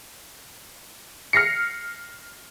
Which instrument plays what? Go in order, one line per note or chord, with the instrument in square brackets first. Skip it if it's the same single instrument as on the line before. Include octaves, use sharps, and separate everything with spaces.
[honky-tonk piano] F6 A#6 C7 C#7